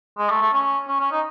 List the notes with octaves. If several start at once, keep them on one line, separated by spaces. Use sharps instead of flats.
G#3
A3
A3
C#4
C#4
C#4
D#4